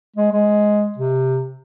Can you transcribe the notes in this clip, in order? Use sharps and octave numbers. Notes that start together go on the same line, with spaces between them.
G#3
G#3
C3